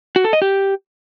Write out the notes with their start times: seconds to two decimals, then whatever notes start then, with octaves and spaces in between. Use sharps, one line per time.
0.16 F#4
0.24 A4
0.33 D#5
0.42 G4